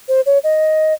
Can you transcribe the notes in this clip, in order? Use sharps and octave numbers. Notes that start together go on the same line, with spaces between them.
C5
C#5
D#5